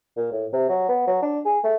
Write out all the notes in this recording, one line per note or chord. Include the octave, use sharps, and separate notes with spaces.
A#2
A2
C3
F#3
B3
F#3
D4
G#4
A3